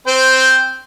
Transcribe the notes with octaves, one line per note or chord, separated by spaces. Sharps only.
C4 C5 G5